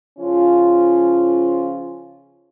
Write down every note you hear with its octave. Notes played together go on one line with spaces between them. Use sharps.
C#3 F3 C#4 F4